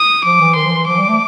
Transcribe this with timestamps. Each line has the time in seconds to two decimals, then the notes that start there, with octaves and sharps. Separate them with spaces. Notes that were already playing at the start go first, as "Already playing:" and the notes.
Already playing: D#6
0.24 F3 D6
0.40 E3
0.56 D#3 C6
0.64 F3
0.72 E3
0.87 F3 D6
0.98 G3
1.08 A3